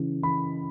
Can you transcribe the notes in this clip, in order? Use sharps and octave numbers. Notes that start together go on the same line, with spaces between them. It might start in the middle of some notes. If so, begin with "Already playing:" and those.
Already playing: C#3 E3
E3 B5